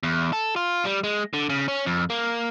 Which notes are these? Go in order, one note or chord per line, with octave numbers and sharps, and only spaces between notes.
E2
A4
F4
G3
G#3
D3
C#3
C#4
F2
A#3